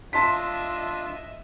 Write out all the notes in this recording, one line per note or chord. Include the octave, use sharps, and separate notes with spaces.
D4 F4 D#5 E5 A5 C6 B6